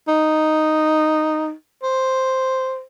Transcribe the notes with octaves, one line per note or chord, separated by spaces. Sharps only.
D#4
C5